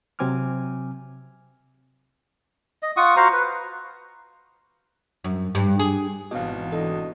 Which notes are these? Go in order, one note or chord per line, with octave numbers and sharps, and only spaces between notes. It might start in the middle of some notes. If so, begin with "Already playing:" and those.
C3 F#3 C4 G#5 D6 F6
D#5
F4 F#5 C#6 D#6
F#4 C5 F5 A#5
B4
F#2
G2
G#4
G#1 B2 E3 D#5 F5
D4 F#4 A4 D#5